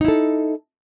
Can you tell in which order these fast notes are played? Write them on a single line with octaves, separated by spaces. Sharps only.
D#4 E4 A4